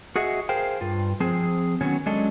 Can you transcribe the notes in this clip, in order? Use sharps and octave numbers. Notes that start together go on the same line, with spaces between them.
F#4 G#4 D#5 E5 F#5
G#4 A#4 C5 F5 G5
G2 F4
F3 C4 G#4
D#3 F#3 B3 C#4 C#5
F#3 G#3 C#4 D4 A4 D#5